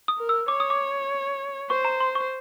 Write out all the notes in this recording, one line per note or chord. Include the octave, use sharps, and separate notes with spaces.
D#6
A#4
E6
C#5 D6
D#6
D6
C5 C#6
A#5
C6
C#6